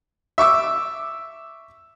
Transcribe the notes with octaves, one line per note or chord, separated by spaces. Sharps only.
E5 C#6 D6 E6